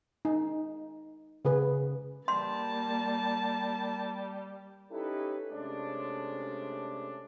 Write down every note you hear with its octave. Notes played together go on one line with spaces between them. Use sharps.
D#4
C#3 G#4 B4
G3 A#3 A5 C6
C#4 D#4 E4 G4 A4 B4
C3 G#3 A3 C#4 D4